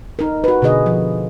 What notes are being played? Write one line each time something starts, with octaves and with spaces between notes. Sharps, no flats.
D#4 A#4
F#4 B4
B2 D3 G#4 D#5
F3